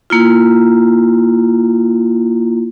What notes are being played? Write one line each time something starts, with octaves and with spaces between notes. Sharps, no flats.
A#3 E4 F4